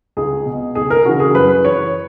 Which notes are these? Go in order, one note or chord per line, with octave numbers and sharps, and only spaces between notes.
C#2 G#4
B2
C#2 G#4
A#4
C#3 E3 F#4
G#4
F#2 B4
E3 C#5